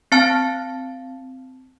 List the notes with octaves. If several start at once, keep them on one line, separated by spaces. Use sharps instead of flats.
C4 F5 A5 F6 A6